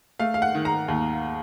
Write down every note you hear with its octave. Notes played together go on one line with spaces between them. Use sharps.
A3 F5
F5
F#5
D#3
A#5
D#2